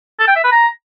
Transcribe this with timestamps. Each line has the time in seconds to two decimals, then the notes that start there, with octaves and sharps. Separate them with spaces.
0.20 A4
0.28 G5
0.36 E5
0.44 B4
0.52 A#5